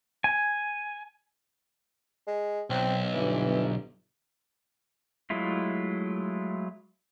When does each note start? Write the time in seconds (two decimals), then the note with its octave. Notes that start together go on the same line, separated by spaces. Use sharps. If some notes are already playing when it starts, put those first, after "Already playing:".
0.24 G#5
2.27 G#3
2.70 B1 C4
3.14 G1 E3
5.30 F#3 G#3 A3 E4 F4